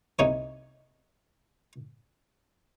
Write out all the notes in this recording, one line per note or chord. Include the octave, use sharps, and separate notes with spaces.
C2 C3 D#4 C#5